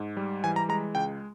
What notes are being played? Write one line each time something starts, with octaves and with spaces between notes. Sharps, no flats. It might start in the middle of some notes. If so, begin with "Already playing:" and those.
Already playing: G#2
G3
E3 G#5
A#5
G#3 A#5
C#2 G5